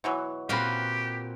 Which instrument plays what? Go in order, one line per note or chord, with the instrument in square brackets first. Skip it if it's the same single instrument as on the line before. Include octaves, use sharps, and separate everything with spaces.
[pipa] B2 E3 F#3
[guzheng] A#2 C4 F#4 [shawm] G4 [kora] B4 F5